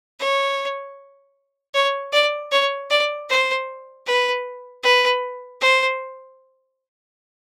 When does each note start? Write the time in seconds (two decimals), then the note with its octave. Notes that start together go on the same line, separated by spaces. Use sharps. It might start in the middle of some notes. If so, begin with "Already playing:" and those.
0.20 C#5
1.74 C#5
2.13 D5
2.52 C#5
2.90 D5
3.29 C5
4.07 B4
4.83 B4
5.61 C5